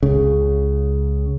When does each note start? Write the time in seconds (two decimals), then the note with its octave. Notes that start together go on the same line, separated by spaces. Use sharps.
0.03 C#2 C#3